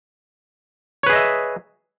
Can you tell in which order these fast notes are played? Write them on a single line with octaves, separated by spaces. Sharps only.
C#5 B4 G#4 D#5 E5